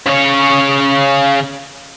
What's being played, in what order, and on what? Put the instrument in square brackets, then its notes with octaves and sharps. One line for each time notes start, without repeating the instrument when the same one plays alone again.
[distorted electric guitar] C#3 C#5